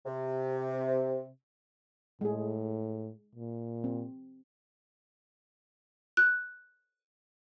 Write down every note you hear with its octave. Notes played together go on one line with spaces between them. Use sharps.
C3
A2 G#3 G#4
A#2
C4
F#6